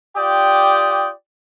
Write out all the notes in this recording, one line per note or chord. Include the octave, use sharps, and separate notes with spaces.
F4 G4 D5 G5 D#6